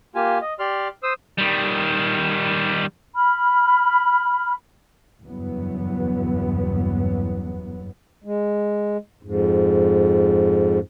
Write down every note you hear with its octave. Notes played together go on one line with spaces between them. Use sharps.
A#3 F4 G4 G#5
D#5
G4 D5 C6 F6
C5 D#6 E6
D#3 G3
B5 F6
F#1 E2 G2 E3 F#3 B3
G#3
F2 G#2